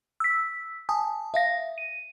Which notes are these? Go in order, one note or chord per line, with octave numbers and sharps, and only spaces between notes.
E6 B6
G#5 A5 D#6
E5 F5 A#6
D#7